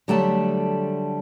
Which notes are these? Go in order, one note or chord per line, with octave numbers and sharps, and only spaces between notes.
D3 F#3 G3 A3 G5 A5